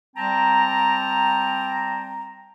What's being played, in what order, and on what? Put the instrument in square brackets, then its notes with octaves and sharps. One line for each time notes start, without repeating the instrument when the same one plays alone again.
[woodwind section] G3 C4 G5 A5 A#5